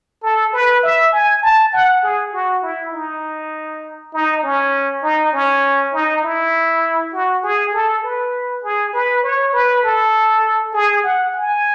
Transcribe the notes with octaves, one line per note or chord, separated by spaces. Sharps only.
A4
B4
E5
G#5
A5
F#5
G#4
F#4
E4
D#4
D#4
C#4
D#4
C#4
D#4
E4
F#4
G#4
A4
B4
G#4
B4
C#5
B4
A4
G#4
F#5
G#5